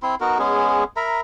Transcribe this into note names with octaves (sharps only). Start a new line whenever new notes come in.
C4 E4 C6
B3 D#4 F#4 A#4
G#3 B3 C#4 G#4
A#4 E5 A#5 B5